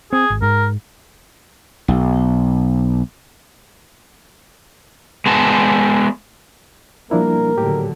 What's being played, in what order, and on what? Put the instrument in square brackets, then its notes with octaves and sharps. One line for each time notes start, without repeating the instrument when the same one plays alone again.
[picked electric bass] C4 [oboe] G#4
[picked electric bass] G#1
[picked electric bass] G#2 [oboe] A#4
[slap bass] B1
[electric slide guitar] G#3 B3 A5
[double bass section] B2 G3 A#3 [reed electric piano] F3 D4 E4 [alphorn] A#4
[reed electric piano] A2 G4 [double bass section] D3 D#3 F#3